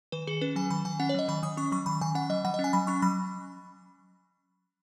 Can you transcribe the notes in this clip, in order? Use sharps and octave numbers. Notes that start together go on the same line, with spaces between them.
D#3 B4
D#3 G#4
C#4 B4
F#3 G#5
D#3 B5
D#3 G#5
C#4 F#5
C#5
F#3 D#5
D#3 B5
D#3 D#6
C#4 C#6
F#3 C#6
D#3 B5
D#3 G#5
C#4 F#5
F#3 D#5
F#3 F#5
D#5
C#4
G#5
F#3 B5
C#4 C#6
F#3 B5